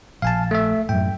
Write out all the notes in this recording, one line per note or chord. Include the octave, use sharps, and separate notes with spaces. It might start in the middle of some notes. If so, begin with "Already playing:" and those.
A#1 F5 G#5 A5
A3 E5
F#2 A2 G5